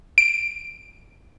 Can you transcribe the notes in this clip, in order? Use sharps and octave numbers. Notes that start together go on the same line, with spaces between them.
D7